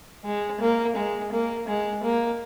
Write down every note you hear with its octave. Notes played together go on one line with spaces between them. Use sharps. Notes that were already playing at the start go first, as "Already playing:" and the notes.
G#3
A#3
G#3
A#3
G#3
A#3